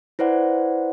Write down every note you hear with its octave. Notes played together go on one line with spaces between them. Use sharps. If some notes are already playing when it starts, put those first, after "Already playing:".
E4 B4 C5 D5 F#5